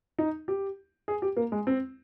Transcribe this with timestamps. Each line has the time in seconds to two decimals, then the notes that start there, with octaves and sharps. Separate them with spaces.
0.19 D#4
0.48 G4
1.08 G#4
1.22 G4
1.37 A#3
1.52 G#3
1.67 C4